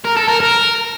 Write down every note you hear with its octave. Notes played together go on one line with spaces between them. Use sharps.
A#4
A4
A#4
A#4